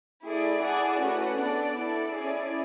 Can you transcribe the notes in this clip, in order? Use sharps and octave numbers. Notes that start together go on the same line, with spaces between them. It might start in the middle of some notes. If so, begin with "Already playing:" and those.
A3 E4 G#4 D5
E4 G#4 D5 F#5 A5
A3 C#4 F#4 B4 F#5
B3 D4 A4 D5
E4 A4 D5 A5
C#4 E4 G#4 D5 G#5